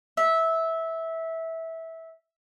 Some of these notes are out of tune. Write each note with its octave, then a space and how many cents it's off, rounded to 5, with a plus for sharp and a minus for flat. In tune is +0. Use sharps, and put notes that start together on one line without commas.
E5 -15